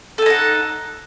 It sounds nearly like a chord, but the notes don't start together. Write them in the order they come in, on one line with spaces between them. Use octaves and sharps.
A4 G#5 D#4 F#5